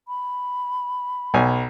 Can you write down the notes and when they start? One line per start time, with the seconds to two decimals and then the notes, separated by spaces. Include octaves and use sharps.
0.08 B5
1.34 B1 G#5